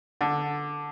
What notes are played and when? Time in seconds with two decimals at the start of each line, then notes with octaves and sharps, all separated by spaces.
0.21 D3